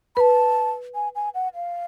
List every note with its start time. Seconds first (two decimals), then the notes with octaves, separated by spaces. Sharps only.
0.16 B4 A5 B5
0.95 G#5
1.15 G#5
1.35 F#5
1.55 F5